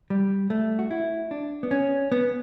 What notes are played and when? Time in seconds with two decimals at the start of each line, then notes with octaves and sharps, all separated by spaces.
0.10 G3
0.50 A3
0.79 F#4
0.91 E4
1.31 D4
1.63 B3
1.71 C#4
2.12 B3